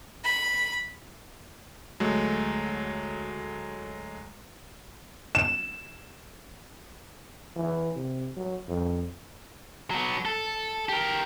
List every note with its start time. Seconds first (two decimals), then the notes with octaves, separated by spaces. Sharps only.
0.24 B5
2.00 D2 F#3 G#3 A3
5.35 E7
7.56 E3
7.96 C3
8.37 F#3
8.68 F2
9.91 F#3 B3
10.25 A4
10.89 G4 A#4